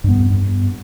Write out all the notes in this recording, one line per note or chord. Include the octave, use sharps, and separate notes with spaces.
G2 B3